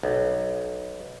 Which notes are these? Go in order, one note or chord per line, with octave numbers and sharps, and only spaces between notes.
B1